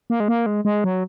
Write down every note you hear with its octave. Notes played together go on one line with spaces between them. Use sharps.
A#3
G#3
A#3
G#3
G#3
F#3